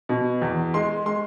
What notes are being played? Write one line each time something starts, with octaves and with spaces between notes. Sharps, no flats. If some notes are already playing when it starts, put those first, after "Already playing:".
B2
E2
G#3 C6
G#3 C6